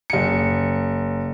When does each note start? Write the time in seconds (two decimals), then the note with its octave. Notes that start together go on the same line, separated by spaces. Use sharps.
0.10 F#1 C#7